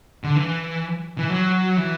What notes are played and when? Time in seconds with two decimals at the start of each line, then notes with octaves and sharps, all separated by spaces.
0.24 D3
0.36 E3
1.18 E3
1.30 F#3
1.77 E3